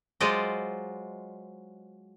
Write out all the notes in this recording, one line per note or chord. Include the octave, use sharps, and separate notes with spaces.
F#3 G#3 F4 C5 D5 D#5